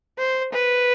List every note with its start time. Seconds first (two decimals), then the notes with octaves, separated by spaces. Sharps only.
0.18 C5
0.53 B4